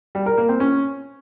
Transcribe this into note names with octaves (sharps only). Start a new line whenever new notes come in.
G3
A#4
A#3
C4
C#4